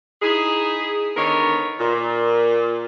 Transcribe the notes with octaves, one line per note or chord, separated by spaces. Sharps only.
D#4 E4 G#4
D3 D#3 B3 A#4 C#5
A#2